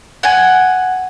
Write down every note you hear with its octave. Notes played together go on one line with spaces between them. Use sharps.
F#5 G#5